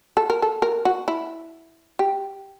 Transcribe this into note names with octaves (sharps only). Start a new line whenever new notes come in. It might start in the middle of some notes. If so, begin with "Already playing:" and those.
A4
A#4
A4
A#4
F#4
E4
G4